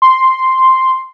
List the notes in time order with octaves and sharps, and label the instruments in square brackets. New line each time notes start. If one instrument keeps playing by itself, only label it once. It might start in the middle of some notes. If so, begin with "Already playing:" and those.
[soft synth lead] C6